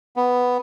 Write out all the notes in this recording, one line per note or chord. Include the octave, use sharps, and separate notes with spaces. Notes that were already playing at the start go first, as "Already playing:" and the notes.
B3